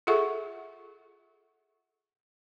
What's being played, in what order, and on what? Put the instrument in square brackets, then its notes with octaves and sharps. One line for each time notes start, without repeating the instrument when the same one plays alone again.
[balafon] F4 G#4 A4 E5 F#5 C#6